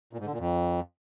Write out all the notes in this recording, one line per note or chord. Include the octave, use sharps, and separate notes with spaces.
A#2
G#2
D3
A#2
F2